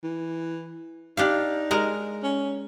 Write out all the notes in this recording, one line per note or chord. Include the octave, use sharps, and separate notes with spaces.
E3
D4 D#4 G4 F5
G#3 A#4 A#5
C#4